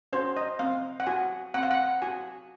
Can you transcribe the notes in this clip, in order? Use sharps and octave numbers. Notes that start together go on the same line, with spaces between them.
C#4 F#4 C5
D#5
C4 F5
F#5
F#4 G#5
C4 F#5
F5
F#5
F#4 G#5